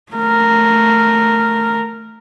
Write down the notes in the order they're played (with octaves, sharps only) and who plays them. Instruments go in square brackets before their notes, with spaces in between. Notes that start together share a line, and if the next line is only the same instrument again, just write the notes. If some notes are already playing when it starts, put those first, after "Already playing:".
[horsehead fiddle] A3 A#4